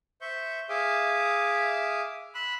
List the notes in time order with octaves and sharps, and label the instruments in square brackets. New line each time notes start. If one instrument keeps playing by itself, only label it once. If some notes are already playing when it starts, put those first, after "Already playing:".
[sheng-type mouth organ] C5 E5 C#6 G6
G#4 E5 F5 D6 D#6
B5 C6 E6 F#6